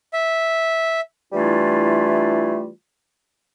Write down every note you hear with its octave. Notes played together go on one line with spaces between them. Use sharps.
E5
E3 G3 A3 D4 E4 F4